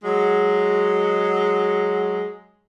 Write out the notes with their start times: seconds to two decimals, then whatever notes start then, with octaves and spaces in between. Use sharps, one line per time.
0.03 F#3 G#3